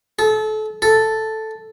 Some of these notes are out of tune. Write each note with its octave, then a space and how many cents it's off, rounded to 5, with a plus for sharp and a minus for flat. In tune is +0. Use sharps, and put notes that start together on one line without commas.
A4 -30
A4 +0